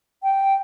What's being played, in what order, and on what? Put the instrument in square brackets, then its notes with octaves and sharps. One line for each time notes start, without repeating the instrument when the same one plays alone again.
[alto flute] G5